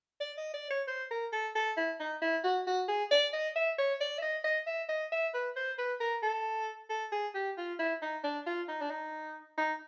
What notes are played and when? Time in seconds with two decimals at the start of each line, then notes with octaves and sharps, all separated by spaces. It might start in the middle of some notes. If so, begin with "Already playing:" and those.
0.20 D5
0.38 D#5
0.54 D5
0.71 C#5
0.88 C5
1.11 A#4
1.33 A4
1.55 A4
1.77 E4
2.00 D#4
2.22 E4
2.44 F#4
2.67 F#4
2.88 G#4
3.11 D5
3.33 D#5
3.56 E5
3.78 C#5
4.00 D5
4.18 E5
4.22 D#5
4.44 D#5
4.67 E5
4.89 D#5
5.12 E5
5.34 B4
5.56 C5
5.78 B4
6.01 A#4
6.23 A4
6.90 A4
7.12 G#4
7.35 G4
7.58 F4
7.79 E4
8.02 D#4
8.24 D4
8.46 F4
8.68 D#4
8.81 D4
8.90 D#4
9.58 D#4